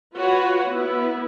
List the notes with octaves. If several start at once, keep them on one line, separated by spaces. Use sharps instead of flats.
F4 F#4 B4 C#5 F#5
B3 E4